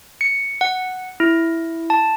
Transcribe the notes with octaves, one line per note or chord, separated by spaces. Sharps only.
C#7
F#5
E4
A5